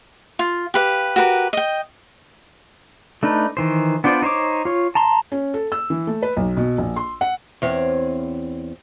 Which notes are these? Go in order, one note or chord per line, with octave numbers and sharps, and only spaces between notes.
F4
G4 B4 F5
F#4 G4 A#4 B4
D#5 G5
A3 D4 D#4 B4
D#3 E3 C5
B3 D4 F4 C5 D5
D#4 C5 C#5 D6
F4 C#5
A5 A#5 C6
C#4
A4
E6
E3
A3
B4
B1
B2
A#1
C6
F#5
E2 C4 C#5